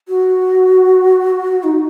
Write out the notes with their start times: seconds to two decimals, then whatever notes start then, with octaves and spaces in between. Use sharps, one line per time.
0.08 F#4
1.63 D#4